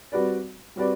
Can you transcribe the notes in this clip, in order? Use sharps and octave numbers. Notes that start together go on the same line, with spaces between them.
G3 C4 F#4 B4 D5
G3 C4 F#4 B4 D5